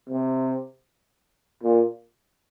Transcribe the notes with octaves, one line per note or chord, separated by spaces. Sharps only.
C3
A#2